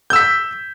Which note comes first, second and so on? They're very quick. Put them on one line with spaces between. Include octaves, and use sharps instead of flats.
G6 E6 B6